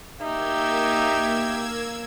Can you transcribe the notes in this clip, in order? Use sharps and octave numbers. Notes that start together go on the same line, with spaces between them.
A#3 D#4 G4 E5 E6 G#6